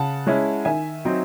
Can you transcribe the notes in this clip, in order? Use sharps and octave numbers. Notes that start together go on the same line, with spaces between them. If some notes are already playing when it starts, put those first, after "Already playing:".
Already playing: C#3 F#5 A5
G#3 C#4 E4
D#3 E5 G#5
F#3 C4 D#4